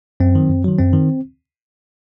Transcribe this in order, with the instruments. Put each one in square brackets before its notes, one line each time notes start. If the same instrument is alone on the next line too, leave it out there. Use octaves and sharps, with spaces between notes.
[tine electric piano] F#2 C4
D#3 F#3
F#2
D#3 F#3
F#2 C4
D#3